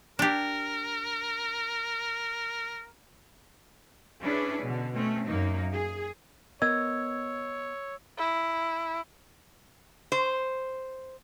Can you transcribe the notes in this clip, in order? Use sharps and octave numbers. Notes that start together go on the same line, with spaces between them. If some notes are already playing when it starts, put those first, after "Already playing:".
D4 G4 A#4
C#4 D4 E4 G#4 B4 D5
B2 D3
A3 C4 C#4
F#2 A#3 D#4
G#4
B3 A#4 C#5 D#5 E6 G#6
E4
C5